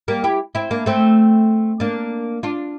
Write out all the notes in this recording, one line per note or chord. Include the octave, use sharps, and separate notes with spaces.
G3 A#3
E4 G4
C4 E4
A#3 D4
A3 C4
A#3 D4
D4 F4